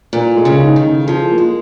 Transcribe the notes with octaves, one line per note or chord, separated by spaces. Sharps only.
A#2 A#4
G#3
C#3
D#4
D#3
C#3
F3 G#4
A#3
G#3